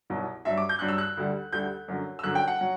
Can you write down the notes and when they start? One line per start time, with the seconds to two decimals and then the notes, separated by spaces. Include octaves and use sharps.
0.10 C2 B2 F#3
0.45 G2 F#3 E5
0.58 D6
0.69 G6
0.79 G2 F#3 F#6
0.88 E6
0.98 F#6
1.17 D2 D3 G3
1.52 D2 D3 G3 G6
1.88 F#2 D3 F#3
2.19 E6
2.24 F#2 D3 F#3 F#6
2.35 G5
2.48 F#5
2.61 F#3